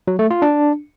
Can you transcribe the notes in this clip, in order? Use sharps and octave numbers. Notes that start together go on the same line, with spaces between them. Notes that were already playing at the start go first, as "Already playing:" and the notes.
F#3
A3
F4
D4